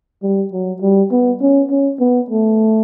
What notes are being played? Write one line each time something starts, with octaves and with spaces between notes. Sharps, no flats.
G3
F#3
G3
B3
C#4
C#4
B3
A3